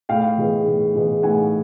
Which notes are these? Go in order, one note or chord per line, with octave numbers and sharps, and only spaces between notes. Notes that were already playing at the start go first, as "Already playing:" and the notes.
A2 F5 G5
E3 G#3 B3
A2
E3 G#3 B3
A2 F#5 G#5